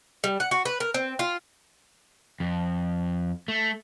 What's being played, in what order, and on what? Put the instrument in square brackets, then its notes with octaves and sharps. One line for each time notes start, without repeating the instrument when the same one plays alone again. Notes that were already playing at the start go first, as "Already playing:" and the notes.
[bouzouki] G3
F#5
F#4
B4
A#4
C4
F4
[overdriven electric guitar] F2
A3